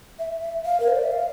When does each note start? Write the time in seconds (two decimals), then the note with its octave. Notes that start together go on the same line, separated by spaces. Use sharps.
0.19 E5
0.42 E5
0.65 F5
0.80 A#4
0.88 C5
0.96 D5
1.04 E5
1.12 F5